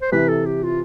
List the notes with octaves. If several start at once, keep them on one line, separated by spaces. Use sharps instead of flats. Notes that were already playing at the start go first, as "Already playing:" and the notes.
C5
C3 E3 B4
A4
G4
F4